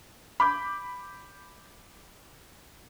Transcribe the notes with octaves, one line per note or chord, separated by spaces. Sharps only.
B5 D6 G6